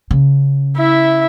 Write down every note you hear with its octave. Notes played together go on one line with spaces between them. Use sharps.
C#3
E4 E5